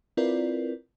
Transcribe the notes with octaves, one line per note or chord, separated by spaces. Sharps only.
C4 E4 F4 A#4 B4 D5